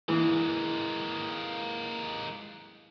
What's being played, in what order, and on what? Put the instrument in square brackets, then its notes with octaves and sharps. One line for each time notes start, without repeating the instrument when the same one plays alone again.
[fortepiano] E3 [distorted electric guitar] G#3 A#3